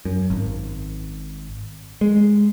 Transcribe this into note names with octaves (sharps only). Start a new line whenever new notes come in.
F#2
G#1
G#3